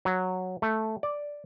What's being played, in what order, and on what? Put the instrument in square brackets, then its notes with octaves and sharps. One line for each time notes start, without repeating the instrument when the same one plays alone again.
[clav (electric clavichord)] F#3
A3
D5